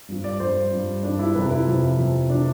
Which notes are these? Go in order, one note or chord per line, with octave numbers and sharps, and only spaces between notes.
G2 F3
D5
G2 F3 C5
G2 F3
G2 F3 D4
E4
F2 C3 F3 B4
E4
F4
F2 C3 F3 E4
F2 C3 F3
C3 F3 D4